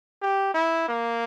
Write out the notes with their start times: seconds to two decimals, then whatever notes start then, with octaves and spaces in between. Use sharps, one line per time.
0.22 G4
0.54 E4
0.89 A#3